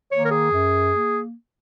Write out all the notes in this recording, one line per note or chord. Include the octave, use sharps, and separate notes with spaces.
D#3 A#3 C#5
A#4
G#4
F#2
A#3